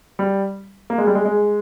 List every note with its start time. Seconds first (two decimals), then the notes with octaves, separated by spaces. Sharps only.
0.19 G3
0.90 A#3
0.98 G#3
1.07 G3
1.15 G#3
1.25 G#3